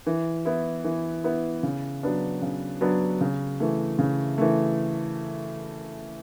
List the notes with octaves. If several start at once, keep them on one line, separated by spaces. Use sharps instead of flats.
E3
B3 E4
E3
B3 E4
C#3
F#3 B3 D4
C#3
F#3 B3 D4
C#3
E3 A3
C#3
E3 A3